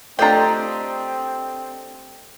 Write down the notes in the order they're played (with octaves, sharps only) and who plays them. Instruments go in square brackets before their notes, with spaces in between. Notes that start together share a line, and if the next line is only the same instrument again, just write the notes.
[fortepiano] A3 D4 [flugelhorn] C4 [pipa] F4 G5 [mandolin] G4 D#5 A#5